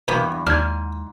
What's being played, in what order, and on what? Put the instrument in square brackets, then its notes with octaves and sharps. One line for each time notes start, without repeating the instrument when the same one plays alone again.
[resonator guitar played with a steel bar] E2 G2 [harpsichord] B2 A#3 B5
[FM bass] D#2 [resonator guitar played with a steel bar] G#2 [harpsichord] D4 [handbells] F6 G#6